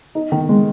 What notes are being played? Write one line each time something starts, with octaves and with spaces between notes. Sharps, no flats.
D#4
D#3
G#3